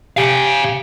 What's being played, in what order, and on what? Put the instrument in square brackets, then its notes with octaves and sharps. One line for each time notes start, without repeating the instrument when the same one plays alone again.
[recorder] G4 [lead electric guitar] F5 G#5